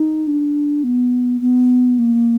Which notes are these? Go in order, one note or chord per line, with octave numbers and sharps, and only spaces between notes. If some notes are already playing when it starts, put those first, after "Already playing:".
Already playing: D#4
D4
B3
B3
A#3